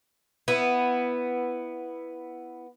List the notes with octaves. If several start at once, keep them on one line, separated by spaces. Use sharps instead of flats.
B3 E4